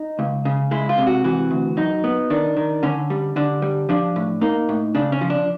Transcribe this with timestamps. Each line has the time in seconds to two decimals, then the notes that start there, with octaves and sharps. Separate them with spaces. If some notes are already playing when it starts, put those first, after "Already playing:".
Already playing: D#4
0.19 C#2
0.45 C#3
0.71 G#3 E4
0.89 F4
0.98 C3
1.07 F#4
1.24 E3 F#4
1.51 D2
1.77 F#2 D#4
2.04 B3
2.30 D#3 D4
2.57 D#3
2.83 D3 C#4
3.10 G3
3.36 D3 D4
3.62 G3
3.89 F3 D4
4.16 A2
4.41 A#3 D#4
4.69 A2
4.95 C#3 D4
5.12 C#4
5.21 F3
5.30 D4